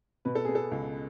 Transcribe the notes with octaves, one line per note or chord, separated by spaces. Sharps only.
B2 B4
A4
B3 G#4
A4
C#2